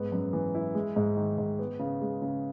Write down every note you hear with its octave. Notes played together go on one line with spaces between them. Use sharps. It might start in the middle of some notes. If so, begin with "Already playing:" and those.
Already playing: G#2 B3
F#2
E3
E4
G#3
G#2
D#3
G#2
B3
C#3
G#3
C#3